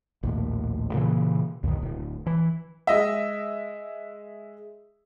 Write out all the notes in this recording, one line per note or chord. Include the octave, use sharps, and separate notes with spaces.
A#1 D#2 A2
A#2 C#3 E3
C#2 F#2 B2 D#3
D1
E3
G#3 D#5 E5